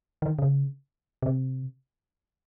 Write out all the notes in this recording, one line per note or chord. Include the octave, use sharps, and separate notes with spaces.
D#3
C#3
C3